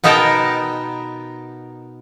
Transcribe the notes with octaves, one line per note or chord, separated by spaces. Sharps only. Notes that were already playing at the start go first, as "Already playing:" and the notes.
B2 B3 D#4 A#4 G5 A5